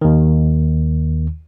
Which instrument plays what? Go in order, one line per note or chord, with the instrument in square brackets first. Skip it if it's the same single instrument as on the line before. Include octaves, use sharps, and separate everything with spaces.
[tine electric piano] D#2 D#3